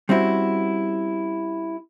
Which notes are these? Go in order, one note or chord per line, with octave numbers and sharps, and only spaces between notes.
G3 C4 C#4 E4 F#4